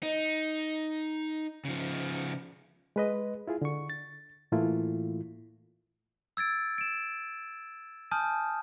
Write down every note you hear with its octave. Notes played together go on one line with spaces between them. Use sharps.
D#4
C#3 F3
G#3 B4 D#5
E4 F4 G#4
D3 C#6
A6
A2 E3 A3 A#3 E4 F4
E6 G#6 A6 D7
D7 E7
G#5 A5 D#6 F6 G6